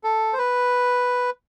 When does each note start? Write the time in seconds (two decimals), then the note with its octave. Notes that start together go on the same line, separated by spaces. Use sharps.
0.04 A4
0.33 C5
0.38 B4